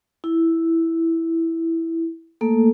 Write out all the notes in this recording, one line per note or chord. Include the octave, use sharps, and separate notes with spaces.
E4
A3 A#3 A4